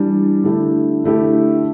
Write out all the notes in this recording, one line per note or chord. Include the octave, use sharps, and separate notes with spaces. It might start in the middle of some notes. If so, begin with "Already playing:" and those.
Already playing: E3 G3 D4
D3 A3 E4 G4
D3 A3 E4 G4